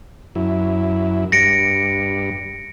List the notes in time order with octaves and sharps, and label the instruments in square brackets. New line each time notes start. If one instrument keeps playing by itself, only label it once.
[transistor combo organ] F#2 E4
[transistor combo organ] G2 [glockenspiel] A#6 C#7 D7